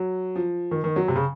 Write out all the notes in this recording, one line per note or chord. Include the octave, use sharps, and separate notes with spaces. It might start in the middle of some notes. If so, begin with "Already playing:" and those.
Already playing: F#3
F3
D#3
D#3
F#3
C3
C#3